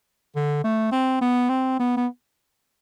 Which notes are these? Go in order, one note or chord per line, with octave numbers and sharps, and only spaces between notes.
D3
A3
C4
B3
C4
B3
B3